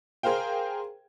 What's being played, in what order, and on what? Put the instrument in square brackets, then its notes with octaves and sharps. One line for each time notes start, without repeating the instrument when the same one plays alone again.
[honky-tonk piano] G#4 A#4 C5 F5 G5